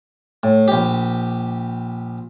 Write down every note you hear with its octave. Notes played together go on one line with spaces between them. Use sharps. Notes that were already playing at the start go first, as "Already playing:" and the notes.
A2
A#1 G4